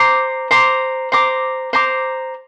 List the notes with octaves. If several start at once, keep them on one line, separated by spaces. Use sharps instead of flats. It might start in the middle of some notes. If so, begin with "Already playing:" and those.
Already playing: C5 A#5 D6
C5 A#5 D6
C5 A#5 D6
C5 A#5 D6